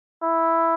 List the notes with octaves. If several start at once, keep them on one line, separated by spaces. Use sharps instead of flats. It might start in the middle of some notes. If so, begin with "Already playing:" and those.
E4